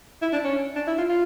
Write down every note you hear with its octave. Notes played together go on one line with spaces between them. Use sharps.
E4
D4
C#4
D4
E4
F4
F4